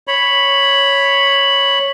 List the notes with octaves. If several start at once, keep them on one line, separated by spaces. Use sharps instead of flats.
C#5 B5